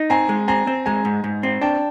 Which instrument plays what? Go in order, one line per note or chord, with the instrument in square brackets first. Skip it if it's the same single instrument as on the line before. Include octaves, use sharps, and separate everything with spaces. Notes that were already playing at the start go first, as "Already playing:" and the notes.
Already playing: [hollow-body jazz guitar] D#4
[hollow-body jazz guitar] C4 [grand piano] G#5 A#5
[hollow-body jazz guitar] G#3
[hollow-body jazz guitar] C4 [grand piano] G#5 A#5
[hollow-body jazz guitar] C4
[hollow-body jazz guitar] G#3 [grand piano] G#5 A#5
[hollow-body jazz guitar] G#2
G#2
C4
[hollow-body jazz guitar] D4 [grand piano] G5 A5